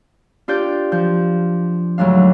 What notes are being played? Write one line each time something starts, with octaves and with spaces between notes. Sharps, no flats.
D4 F4 G4 D5 G6
F3 G6
D2 G#2 F#3 D4 F5